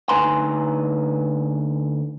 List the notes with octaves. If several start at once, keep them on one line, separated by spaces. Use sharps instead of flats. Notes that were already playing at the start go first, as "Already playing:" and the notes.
D2 D#4 B4 G#5 A#5 C6